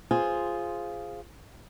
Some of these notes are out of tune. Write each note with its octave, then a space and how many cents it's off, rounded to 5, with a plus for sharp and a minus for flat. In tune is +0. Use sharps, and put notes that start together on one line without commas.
F4 -5 G#4 +0 C5 +0